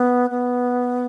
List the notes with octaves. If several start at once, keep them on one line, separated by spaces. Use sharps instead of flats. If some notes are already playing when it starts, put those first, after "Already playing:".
Already playing: B3
B3